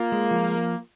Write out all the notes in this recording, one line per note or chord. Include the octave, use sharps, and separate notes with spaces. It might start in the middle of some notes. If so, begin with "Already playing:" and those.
Already playing: A#3 F4
G#3
F3